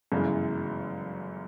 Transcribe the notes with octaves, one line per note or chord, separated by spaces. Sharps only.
G1 F#2 C#3 E3 G#3